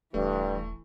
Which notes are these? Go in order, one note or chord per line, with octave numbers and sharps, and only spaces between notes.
D#1 G2 E3 A3